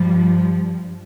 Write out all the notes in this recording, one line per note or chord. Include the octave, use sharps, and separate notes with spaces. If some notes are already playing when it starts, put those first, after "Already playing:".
Already playing: G2 F3 G3